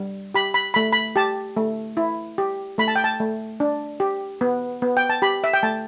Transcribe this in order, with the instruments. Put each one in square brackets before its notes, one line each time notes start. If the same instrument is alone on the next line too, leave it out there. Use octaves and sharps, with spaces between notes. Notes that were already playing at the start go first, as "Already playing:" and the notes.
Already playing: [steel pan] G3
G4 B5
B5
A3 B5
B5
G4 A5
A3
E4
G4
A3 B5
A5
G5
A5
A3
D4
G4
B3
B3
G5
A5
G4 B5
E5
G5
A3 A5